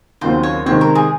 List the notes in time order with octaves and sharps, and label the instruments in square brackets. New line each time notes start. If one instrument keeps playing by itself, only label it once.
[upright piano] D#2 C#3 F#3 C4 F4 [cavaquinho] C5
[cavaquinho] C#5
[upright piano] C3 D#3 G#3 C4 [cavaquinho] C#5
[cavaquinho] A#4
G#4